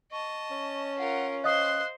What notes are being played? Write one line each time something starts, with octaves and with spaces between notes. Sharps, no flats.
D#5 A5 C#6
C#4
F4 A#4 F#5
C5 D#5 F5 C6 D#6 F#6